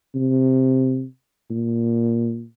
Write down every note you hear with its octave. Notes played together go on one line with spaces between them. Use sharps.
C3
A#2